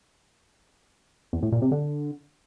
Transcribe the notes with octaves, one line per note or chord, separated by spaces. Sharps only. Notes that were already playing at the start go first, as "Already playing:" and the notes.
E2
A2
A#2
C3
D3